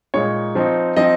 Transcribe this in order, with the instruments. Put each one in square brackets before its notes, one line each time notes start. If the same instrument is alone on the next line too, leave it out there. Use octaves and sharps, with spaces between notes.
[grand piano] A#2 G#3 D#4 C#5
F3 C4 D#4
F3 C4 D#4 D#5